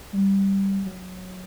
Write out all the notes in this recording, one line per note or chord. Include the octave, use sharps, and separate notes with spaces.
G3
F#3